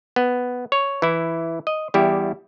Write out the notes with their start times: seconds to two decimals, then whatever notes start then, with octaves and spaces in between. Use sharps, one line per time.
0.16 B3
0.72 C#5
1.02 E3 E4
1.67 D#5
1.94 E2 G3 E4 G4